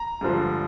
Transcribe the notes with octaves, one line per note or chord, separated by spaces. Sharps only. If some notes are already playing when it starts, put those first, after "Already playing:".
Already playing: A#5
G2 D3 F3 G#3